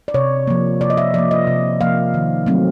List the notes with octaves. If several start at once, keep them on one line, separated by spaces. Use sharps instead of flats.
D5
C3 C#5
F3 A#3
C3 D5
D#5
E5
F3 A#3 D5
D#5
C3
F3 A#3 F5
D#3
F#3 A3 C4